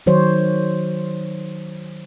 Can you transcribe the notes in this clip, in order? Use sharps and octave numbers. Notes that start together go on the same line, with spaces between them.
D#3 F#3 C5 C#5